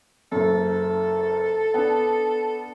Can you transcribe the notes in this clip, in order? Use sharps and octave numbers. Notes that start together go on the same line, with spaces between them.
F#1 F#2 A4
B3 D4